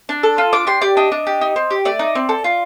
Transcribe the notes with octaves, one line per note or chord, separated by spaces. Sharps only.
D4
A4
F4
D4 D6
G4 C6
G4 D5
D4 D#5
D4
G4
D#4
C4
G4
A3 D5
D#4
C4
A4
F4